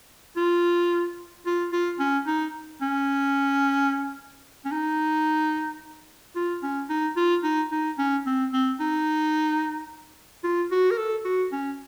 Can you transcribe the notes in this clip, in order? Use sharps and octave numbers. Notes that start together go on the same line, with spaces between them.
F4
F4
F4
C#4
D#4
C#4
C#4
D#4
F4
C#4
D#4
F4
D#4
D#4
C#4
C4
C4
D#4
F4
F#4
A#4
A4
F#4
C#4